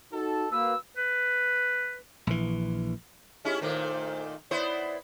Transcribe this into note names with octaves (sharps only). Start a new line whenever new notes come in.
D#4 F#4 A4
A#3 F#4 B4 E6
B4
A#1 E3
G#3 C#4 E4 G4
A#2 D#3 A3 C5
B3 E4 C5 D5